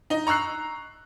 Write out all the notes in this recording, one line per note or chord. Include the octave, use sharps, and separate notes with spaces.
D#4 D#5
A#5 C#6 E6 F#6 C7